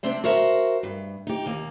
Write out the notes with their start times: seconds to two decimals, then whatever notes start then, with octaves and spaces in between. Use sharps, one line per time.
0.03 C3 C4 D4 C5 E5
0.24 F#4 A#4 C5 E5
0.83 G2
1.27 D#4 G4
1.46 D#2 A#3